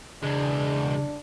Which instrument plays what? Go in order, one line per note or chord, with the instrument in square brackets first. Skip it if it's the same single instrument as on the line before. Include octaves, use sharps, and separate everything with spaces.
[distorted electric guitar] E2 G#3 [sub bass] C#3 [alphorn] D4